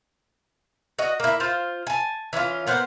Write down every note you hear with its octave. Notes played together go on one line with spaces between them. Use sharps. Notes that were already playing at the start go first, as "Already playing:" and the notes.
F#4 D#5
A#3 E4
F4 C5
G#5 A5
E3 C#4 E4 F4
A#3 B3 C5 F#5